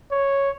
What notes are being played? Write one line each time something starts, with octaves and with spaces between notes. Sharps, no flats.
C#5